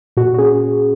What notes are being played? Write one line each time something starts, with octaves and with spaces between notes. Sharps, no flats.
A#2 F#4
F#4
C#4 G#4